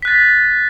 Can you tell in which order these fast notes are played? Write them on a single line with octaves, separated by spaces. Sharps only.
B6 F#6 A6